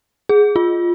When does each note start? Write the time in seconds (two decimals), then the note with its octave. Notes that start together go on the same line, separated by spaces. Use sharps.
0.29 G#4
0.56 F4